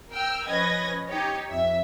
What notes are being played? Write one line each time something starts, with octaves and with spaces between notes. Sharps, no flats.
A#4 G5 E6 F6
F3 C#4 B4 D#5 G#6 A#6
D#4 G4 C#5
F2 E5